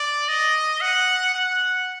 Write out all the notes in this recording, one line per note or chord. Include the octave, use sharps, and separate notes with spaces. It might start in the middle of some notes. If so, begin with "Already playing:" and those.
Already playing: D5
D#5
F#5
F#5